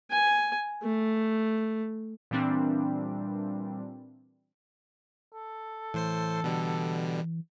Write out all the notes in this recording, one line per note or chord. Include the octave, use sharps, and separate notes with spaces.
G#5
A3
A#2 E3 G3 C4 D4
A4
A2 E3 C5 C7
B2 D3 G3